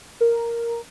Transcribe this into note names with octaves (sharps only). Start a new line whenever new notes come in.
A#4